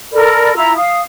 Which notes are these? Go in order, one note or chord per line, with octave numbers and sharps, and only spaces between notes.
A4 A#4 D5 B5
E4 F4 A#5 E6
F5 D#6